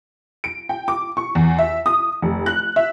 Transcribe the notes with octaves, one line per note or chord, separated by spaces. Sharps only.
D7
G5
D6
C#6
E2
E5
D#6
F1
F#6
E5